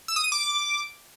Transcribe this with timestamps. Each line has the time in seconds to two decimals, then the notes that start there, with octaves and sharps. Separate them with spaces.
0.08 E6
0.16 D#6
0.24 D#7
0.32 D6